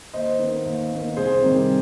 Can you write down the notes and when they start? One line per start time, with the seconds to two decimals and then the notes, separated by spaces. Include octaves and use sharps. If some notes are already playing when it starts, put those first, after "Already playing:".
0.13 D#2 C5 D#5
0.39 D#3 B3
0.65 D#2
0.91 D#3 B3
1.17 C2 G#4 C5
1.42 C3 D#3 G3 C4